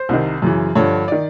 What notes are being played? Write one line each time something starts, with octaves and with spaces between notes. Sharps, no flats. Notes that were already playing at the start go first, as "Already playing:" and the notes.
Already playing: C5
C2 C3 D#3
F#2 C#3 E3
G2 D3 F3 C#5
D#3 D5